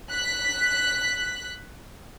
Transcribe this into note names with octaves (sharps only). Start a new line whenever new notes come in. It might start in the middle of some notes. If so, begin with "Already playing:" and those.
F#6 B6